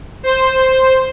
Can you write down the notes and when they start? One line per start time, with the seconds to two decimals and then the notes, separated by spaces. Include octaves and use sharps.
0.23 C5